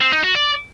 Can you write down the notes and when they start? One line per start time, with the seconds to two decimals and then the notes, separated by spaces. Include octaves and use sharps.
0.01 C4
0.13 D#4
0.24 F#4
0.35 D5